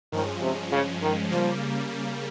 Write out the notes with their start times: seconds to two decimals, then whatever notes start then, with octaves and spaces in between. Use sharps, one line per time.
0.12 G2 D#3 F3 G#3 C#4
0.42 C3
0.72 C#3
1.02 D#3
1.31 C#3 F3 G3 A#3